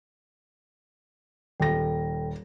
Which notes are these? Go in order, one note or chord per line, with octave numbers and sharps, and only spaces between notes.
D#1 A4 G5 A#6